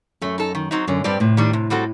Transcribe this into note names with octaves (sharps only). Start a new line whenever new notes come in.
F#2 A3
D#4 A4
D#3
F#3 C4 D#4
F#2 D3
G2 G3 C4 G4 D5
A2 C3
D#3 G3 D4
C3
G3 C4 F#4 A4